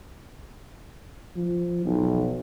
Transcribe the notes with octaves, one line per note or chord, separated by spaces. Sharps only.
F3
B1